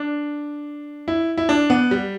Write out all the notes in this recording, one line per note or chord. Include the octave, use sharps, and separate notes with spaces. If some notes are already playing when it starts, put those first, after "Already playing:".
Already playing: D4
E4
E4
D4
B3
G3